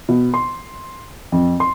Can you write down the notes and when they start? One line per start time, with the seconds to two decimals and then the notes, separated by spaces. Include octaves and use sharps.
0.09 B2
0.34 C6
1.32 F2
1.60 C6